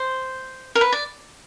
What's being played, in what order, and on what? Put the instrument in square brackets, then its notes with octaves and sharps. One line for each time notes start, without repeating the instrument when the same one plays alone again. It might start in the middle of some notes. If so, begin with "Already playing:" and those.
Already playing: [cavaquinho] C5
A#4
B4
D5